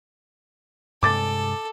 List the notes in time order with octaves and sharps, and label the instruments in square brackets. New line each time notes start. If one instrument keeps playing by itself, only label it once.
[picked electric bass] G2 C3 G#3 [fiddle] A4 [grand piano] D6 A6